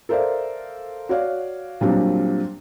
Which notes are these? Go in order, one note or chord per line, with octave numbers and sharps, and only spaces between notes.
A4 A#4 C5 D5 E5 F5
F#4 C#5 D5 F5
A#2 F#3 G3 C4 D4